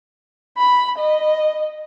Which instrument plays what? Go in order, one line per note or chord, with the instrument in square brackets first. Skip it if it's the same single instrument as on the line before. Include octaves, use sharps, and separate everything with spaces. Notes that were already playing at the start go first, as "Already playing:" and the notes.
[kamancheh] B5
D#5